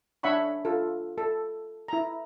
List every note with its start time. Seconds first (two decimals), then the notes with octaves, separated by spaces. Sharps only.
0.23 D4 C#5 E5 F#5 B5 C#6
0.65 F4 A4
1.18 A4
1.88 E4 A#5